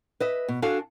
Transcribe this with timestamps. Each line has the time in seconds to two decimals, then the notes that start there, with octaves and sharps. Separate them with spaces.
0.20 B4 D#5 E5
0.48 B2
0.62 D4 F#4 A4 F5 G#5